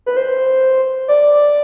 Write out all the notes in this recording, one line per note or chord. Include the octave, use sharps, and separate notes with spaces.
B4
C5
D5